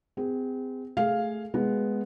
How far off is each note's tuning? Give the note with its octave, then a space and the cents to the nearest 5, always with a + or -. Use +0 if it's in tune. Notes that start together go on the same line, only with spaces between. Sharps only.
C4 -35 G#4 -30
A3 +0 G#4 +0 F5 +0
G#3 +0 B3 +0